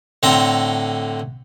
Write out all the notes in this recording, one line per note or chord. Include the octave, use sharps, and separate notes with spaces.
A2 D3 C4 A4 A#5 C6